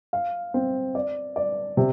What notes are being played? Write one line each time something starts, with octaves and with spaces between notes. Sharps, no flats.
F5
C4
D5
D5
C3